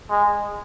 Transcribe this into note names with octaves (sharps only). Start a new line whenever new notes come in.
G#3